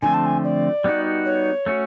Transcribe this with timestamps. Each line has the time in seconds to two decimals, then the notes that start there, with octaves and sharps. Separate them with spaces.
0.02 D3 F3 A3 C4 G#5
0.14 A5
0.26 G#5
0.44 D5
0.84 G3 B3 D#4 F#4
1.25 C#5
1.66 A3 C#4 F#4